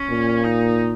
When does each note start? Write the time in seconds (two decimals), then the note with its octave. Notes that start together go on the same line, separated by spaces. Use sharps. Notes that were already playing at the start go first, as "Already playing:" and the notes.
Already playing: C#4
0.09 A#2
0.44 D#4